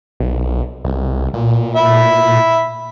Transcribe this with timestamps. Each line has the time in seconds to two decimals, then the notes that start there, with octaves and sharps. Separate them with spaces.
0.20 B1
0.85 C2
1.34 A#2
1.76 E5 B5